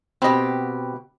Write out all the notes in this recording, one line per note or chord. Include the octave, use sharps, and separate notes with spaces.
B2 C4 G4 D#5